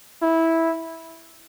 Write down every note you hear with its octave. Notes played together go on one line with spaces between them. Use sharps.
E4